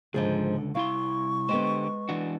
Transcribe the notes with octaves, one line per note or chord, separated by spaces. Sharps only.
C#2 G#2 D3 F3 G#4
C2 E4 F5 C6 C#6
D3 G#3 B3 G4 C5
E3 D4 F#4